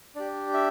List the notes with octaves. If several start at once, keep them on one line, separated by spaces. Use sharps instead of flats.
D4 G4 D5
E5